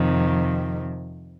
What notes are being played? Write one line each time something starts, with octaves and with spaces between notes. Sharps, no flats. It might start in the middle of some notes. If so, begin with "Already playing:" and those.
Already playing: F2 C3 D#3